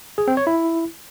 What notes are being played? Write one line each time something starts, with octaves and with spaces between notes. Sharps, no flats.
G#4
C4
C#5
E4